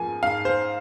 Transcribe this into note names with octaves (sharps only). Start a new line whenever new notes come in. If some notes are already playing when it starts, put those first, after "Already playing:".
Already playing: G#2 F3 A#3 G#5
G#2 F5
C5